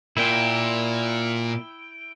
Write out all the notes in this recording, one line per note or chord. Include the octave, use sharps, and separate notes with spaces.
A#2 E4 G5